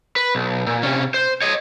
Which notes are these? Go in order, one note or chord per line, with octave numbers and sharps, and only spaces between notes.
B4
B1
A#2
C3 C#4
C5
C#5 D#5